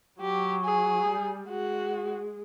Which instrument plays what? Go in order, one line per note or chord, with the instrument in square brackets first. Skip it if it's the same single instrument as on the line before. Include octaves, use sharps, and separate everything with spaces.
[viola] F#3 [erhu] G4
[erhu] G#4
[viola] G3
[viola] G#3 [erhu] F#4